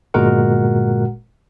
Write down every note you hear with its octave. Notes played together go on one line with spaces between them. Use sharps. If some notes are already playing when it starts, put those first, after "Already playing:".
G1 A#2 G#3 F#4 A#4 F#5